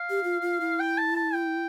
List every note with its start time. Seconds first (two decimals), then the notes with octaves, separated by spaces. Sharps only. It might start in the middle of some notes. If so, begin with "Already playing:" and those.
Already playing: F5
0.10 G4
0.24 F4
0.42 F4
0.61 E4
0.79 G5
0.98 A5
1.16 A5
1.34 G5